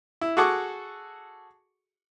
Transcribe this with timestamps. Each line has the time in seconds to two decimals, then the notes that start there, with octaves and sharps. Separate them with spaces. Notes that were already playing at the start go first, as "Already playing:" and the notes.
0.21 E4
0.37 F#4 G#4 A4 F#5 C#6 D6